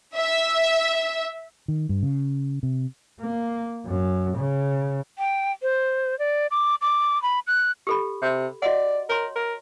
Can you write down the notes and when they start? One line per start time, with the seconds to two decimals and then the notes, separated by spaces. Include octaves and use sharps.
0.16 E5
1.68 D#3
1.89 G2
2.03 C#3
2.63 C3
3.20 A#3
3.86 F#2
4.37 C#3
5.19 G5
5.62 C5
6.19 D5
6.51 D6
6.82 D6
7.22 B5
7.47 F#6
7.87 G4 A4 B5
8.22 C3
8.62 F#4 D5 D#5 F#5
9.10 A#4 C#5 C6
9.36 A#4